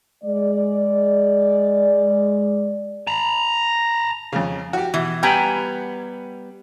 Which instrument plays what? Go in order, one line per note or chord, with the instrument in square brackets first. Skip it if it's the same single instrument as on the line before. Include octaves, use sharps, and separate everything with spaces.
[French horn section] G#3 D5
[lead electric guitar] A5 A#5
[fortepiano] F2 C#3
F#4 G4
[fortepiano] B2 [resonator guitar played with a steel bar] E3
[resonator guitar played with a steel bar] G3 B3 A#5 [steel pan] G5 G#5 B5